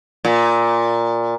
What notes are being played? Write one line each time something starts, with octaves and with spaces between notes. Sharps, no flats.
A#2